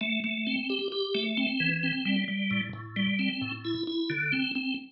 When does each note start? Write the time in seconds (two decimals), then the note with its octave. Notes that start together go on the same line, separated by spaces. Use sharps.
0.01 A3
0.24 A3
0.47 C4
0.70 G4
0.92 G4
1.15 A3
1.37 C4
1.60 E3
1.83 C4
2.05 G3
2.28 G3
2.51 A2
2.73 A2
2.96 G3
3.19 C4
3.41 A2
3.65 E4
3.87 E4
4.10 D3
4.32 C4
4.55 C4